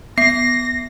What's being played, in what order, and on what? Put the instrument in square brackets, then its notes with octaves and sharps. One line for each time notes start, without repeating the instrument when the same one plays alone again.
[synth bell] B3 [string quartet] A#6 [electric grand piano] C7